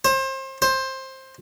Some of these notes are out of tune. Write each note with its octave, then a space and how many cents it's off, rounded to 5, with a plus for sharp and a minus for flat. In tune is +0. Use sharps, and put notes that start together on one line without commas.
C5 +30
C5 +15